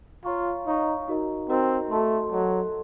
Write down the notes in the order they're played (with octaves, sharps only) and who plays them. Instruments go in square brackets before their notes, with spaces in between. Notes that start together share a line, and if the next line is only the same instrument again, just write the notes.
[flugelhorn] F4 [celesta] C#5 F5 A#5 C#6
[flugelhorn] D#4 [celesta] C#5 F5 A#5 C#6
[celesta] D#4 F#4 A#4 D#5 A#5
[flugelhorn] C4 [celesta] D#4 F#4 A#4 D#5 A#5
[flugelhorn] A3 [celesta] F#4 A4 D#5 A5 C6
[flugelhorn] F#3 [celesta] F#4 A4 D#5 A5 C6